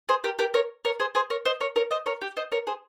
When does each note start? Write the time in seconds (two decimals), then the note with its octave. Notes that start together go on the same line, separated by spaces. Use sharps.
0.09 G#4 C5
0.24 G4 A#4
0.39 G4 A#4
0.54 A#4 C#5
0.85 A#4 C#5
1.00 G#4 C5
1.15 G#4 C5
1.30 A#4 C#5
1.45 C5 D#5
1.60 A#4 C#5
1.76 A#4 C#5
1.91 C5 D#5
2.06 A#4 C#5
2.21 G4
2.37 C5 D#5
2.52 A#4 C#5
2.67 G#4 C5